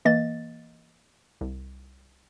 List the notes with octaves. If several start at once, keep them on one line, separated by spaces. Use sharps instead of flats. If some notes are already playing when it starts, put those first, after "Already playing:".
E3 A#3 D#5 A6
C2